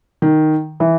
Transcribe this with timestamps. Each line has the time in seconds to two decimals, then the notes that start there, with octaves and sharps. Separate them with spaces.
0.22 D#3
0.80 E3